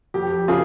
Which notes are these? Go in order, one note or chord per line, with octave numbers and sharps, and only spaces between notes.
F2 G4
C#3 F4 G#4